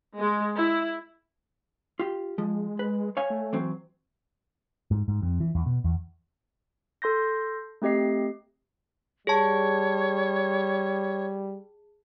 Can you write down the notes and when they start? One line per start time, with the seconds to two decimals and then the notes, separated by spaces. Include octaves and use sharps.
0.17 G#3
0.56 E4
1.99 F4 G4
2.38 F3 G#3
2.79 B4
3.17 C#5 F5 G#5
3.30 A3
3.53 E3 F#3 C4
4.91 G#2
5.08 G#2
5.22 F2
5.40 E3
5.55 E2
5.66 B2
5.84 E2
7.02 A4 C6 G6 A#6
7.82 A3 C4 G4 D#5 C7
9.27 G3 G#4 C#5 A5